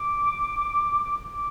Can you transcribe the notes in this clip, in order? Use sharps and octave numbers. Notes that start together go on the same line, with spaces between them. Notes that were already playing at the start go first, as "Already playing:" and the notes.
Already playing: D6
D6